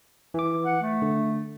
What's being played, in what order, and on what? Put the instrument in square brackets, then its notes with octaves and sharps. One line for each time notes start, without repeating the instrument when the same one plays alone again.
[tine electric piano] E3 D6
[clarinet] F#5
A3
[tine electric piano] D3